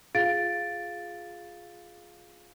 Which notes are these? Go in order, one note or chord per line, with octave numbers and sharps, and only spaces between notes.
F4 G#4 F5 A6 D7